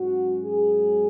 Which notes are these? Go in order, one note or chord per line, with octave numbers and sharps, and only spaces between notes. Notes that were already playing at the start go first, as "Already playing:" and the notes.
Already playing: G#2 F#3 C#4 F#4
G#4